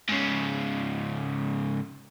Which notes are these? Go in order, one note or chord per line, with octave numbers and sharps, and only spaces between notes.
G#2 C#3